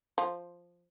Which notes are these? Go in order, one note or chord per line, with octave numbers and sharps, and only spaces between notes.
F3